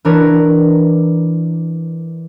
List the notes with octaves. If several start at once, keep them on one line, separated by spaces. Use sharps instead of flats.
E3 D4 A#4 B4 C#5